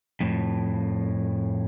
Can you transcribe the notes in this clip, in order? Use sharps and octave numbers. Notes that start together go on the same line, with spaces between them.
F2 A2